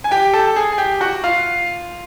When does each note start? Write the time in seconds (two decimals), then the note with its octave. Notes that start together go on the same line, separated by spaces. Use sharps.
0.04 G#5
0.11 G4 G5
0.33 A4 A5
0.56 G#4 G#5
0.72 G#5
0.78 G4 G5
1.01 F#4 F#5
1.24 F4 F5